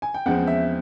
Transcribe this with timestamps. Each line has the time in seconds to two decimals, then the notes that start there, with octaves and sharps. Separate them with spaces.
0.02 G#5
0.14 G5
0.26 E2 C#3 F3 G#3 C4 F#5
0.47 E5